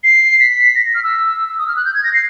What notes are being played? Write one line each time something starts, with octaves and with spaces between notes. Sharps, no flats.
C7
B6
A#6
F6
E6
E6
D#6
F6
F#6
G6
G#6
A#6
C7